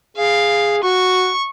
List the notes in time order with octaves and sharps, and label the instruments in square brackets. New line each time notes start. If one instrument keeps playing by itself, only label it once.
[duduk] G#4 [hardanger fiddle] F5
[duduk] F#4 [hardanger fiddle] C#6